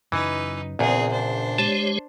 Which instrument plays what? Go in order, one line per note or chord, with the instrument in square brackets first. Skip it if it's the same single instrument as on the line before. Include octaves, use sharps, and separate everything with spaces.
[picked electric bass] F#2 C#3 F#3 [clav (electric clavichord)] E3 [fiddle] D#4 B4
[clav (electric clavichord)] A#1 E2 [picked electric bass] A#2 C#3 B3 [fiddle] C4 G#4
[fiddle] D4 C5
[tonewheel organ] G#3 G4 C#5 [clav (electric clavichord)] A5